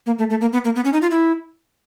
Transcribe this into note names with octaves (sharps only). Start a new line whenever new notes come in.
A#3
A3
A3
A#3
B3
A#3
B3
C#4
D#4
F4
E4